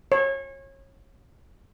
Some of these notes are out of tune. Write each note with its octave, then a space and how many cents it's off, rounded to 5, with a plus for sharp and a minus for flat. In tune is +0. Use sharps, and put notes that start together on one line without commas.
C#5 -30